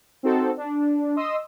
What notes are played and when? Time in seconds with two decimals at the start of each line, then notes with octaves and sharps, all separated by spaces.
0.23 C4 D#4 F#4 A4
0.57 D4
1.16 D#5 C6 D#6 E6